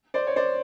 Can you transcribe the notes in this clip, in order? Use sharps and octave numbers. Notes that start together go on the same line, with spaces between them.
C5 D5
C#5
C5 D5